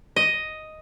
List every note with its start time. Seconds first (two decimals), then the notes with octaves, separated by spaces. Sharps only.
0.16 D#5